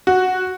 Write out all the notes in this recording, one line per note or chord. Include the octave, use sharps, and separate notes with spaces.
F#4